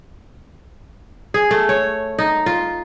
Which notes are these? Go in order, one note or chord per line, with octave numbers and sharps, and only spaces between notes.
G#4
A3
C#5
D#4
F4